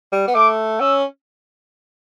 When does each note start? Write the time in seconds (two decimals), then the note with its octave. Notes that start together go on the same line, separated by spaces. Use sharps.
0.12 G3
0.28 B3
0.35 A3 D6
0.80 C#4 E6